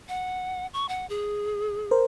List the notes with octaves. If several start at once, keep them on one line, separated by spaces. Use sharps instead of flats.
F#5
C#6
F#5
G#4
A#4 C5